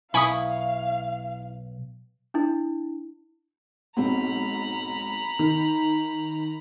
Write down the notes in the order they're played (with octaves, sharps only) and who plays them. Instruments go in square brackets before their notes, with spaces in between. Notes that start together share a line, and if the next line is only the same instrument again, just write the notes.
[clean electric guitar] B1 [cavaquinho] E4 C#6 D#6 [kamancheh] F5 [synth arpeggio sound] G#5 B5
[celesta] D4 E4
[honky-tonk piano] B1 G#2 C4 [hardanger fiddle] A#5 B5
[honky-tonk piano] D#3